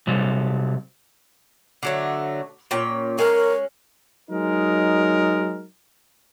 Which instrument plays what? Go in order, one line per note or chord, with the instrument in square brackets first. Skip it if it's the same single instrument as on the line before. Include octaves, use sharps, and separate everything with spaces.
[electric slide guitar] C3 F#3 G3
[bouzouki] D3 F#3 A3
A#2 C#4 G5
[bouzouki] G#3 C#4 [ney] A#4
[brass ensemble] F#3 G#3 D#4 A#4